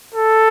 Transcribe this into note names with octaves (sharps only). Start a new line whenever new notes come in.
A4